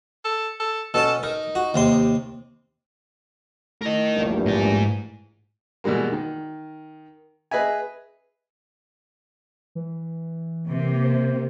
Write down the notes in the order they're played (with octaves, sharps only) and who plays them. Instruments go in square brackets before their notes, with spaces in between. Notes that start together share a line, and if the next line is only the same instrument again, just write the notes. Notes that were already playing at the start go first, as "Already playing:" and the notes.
[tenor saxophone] A4
A4
[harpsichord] B2 C#4 A5 [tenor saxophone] A4
[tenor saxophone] D#4 [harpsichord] A#4
[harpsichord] F#4
D#2 C3 C6
[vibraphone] A3 E4 [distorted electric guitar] A#4 D#5
[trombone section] A#1 E2 G2
[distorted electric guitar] G#2 G#5
[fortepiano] B2 E3 G3 G#3 A#3
D#3
G#4 B4 D#5 E5 G#5
[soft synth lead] E3
[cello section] C3 A#3
[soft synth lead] C5